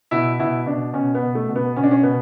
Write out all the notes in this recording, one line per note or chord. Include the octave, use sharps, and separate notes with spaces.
B2 E4
B2 E4
B2 D4
B2 C#4
B3
B2
A3
B2
B3
B2 C#4
D4
C#4
B2 B3